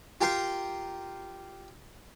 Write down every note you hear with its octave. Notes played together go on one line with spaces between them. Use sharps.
F4 G4 A#4 G5 C6